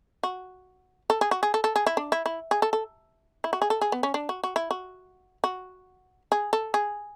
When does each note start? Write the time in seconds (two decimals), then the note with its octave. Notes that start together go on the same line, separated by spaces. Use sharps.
0.23 F#4
1.10 A4
1.21 G#4
1.31 F#4
1.43 G#4
1.54 A4
1.64 A4
1.76 G#4
1.86 E4
1.97 D4
2.12 E4
2.26 E4
2.51 G#4
2.62 A4
2.73 A4
3.44 E4
3.53 F#4
3.62 G#4
3.70 A4
3.81 G#4
3.92 B3
4.03 C#4
4.14 D4
4.29 F#4
4.44 F#4
4.56 E4
4.71 F#4
5.44 F#4
6.32 G#4
6.53 A4
6.74 G#4